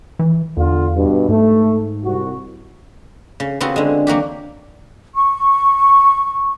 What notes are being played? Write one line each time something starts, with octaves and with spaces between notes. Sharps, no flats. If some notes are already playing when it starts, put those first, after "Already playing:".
E3
E2 D3 F4
G2 B2
G#2 A3
C2 F#4
C#3
C#3 B3 C4 F4 F#4
D3 G#3
F#3 A#3 F#4 G4
C#6